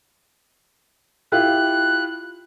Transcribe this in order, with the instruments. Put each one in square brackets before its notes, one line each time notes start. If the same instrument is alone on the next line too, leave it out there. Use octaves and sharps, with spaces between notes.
[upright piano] E4 F4 G4 [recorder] F#6